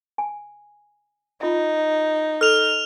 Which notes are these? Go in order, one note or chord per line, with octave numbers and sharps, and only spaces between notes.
G#5
D#4 F4 E5
A4 F6 F7